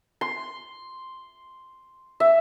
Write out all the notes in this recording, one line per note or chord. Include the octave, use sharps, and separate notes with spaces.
C6
E5